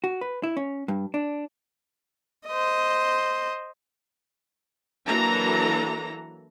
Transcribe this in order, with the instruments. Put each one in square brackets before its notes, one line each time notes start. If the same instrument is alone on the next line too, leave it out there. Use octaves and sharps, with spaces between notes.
[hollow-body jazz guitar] F#4
B4
E4
C#4
G2
D4
[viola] C5 D#5
[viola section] E3 F#3 A#3 D4 A4 A#5